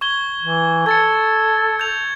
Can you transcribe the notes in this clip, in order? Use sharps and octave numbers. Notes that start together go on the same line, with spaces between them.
C#6 G#6 G7
E3
A4 G#6 A6 C#7
G6 F7